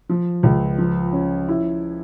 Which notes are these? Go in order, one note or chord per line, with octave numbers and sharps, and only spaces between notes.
F3
C#2
F3
C#4
E4